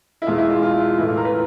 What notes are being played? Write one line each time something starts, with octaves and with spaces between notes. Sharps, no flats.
E4
E2 B2 G#3 F4
E4
F4
F4
A2 E3 A3 E4
F4
A#4
B4